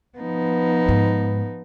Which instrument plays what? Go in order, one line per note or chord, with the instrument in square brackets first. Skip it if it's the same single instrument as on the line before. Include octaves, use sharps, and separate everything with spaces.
[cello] F3 D#4 [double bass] B3
[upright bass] G#2